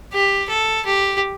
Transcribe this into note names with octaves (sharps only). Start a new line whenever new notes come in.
G4
A4
G4